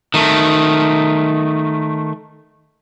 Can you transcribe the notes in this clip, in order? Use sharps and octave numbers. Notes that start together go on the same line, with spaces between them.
D#3 A3